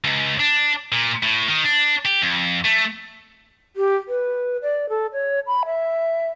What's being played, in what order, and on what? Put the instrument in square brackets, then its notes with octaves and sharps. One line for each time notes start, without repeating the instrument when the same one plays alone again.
[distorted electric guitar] C#2
D4
A#2
A2
D#3
D4
G4
F2
A3
[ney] G4
B4
D5
A4
C#5
B5
E5